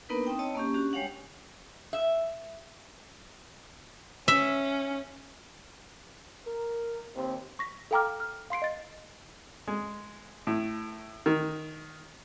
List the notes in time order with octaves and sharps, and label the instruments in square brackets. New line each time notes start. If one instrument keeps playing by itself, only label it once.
[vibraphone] A#3 B3 D4 D#4 A#4 B4
C4 D#4 G5 D#6
C#5 D#5 A5 E6
A#3 C#4 G4
C#4 D4 F#4 G4
G3 G#3 C#5 F5 F#5
[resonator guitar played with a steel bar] E5
[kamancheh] C#4 [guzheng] E5
[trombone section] A#4
D#2 C4
[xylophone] C#6 A#6 B6
A4 F5 G5 A#5 D6 F6
F6
F5 C6 C7 D7
D#5 A6
[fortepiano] G#3
A2
D#3